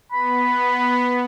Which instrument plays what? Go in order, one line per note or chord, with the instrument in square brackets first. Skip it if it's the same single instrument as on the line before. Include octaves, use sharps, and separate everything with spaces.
[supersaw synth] B3 [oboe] B5